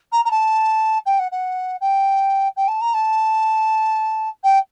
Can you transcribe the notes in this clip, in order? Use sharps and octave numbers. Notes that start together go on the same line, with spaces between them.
A#5
A#5
A5
G5
F#5
F#5
G5
G5
A5
A#5
A5
G5